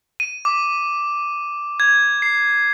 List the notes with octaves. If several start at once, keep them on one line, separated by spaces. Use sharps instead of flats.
D#7
D6
G#6
C7